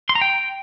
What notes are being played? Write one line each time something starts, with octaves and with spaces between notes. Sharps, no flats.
C6
A#5
G5